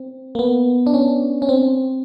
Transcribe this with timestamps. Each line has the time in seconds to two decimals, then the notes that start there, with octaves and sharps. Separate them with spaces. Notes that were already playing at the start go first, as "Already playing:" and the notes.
Already playing: C4
0.35 A#3
0.39 B3
0.87 D4
0.94 C#4
1.42 C#4
1.49 C4